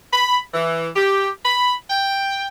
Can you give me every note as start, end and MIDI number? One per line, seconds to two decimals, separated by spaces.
0.13 0.40 83
0.54 0.89 52
0.96 1.29 67
1.45 1.75 83
1.90 2.47 79